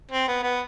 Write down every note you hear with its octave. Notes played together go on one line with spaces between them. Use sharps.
C4
B3
B3